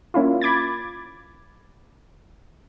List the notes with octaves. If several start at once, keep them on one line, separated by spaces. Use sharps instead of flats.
A#3 C#4 E4 F4
B5 D6 G#6 A6